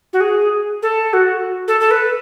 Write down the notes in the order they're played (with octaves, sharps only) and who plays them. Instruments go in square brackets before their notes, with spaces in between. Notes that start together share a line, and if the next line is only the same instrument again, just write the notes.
[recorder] F#4
G#4
A4
F#4
A4
A4
B4